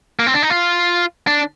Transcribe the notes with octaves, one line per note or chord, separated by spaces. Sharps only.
A#3
C4
D4
D#4
F4
D4